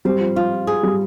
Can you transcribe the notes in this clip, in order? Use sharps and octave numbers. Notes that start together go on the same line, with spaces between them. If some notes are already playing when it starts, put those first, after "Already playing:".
G3 C4
F3
F3 F4
G#4
G3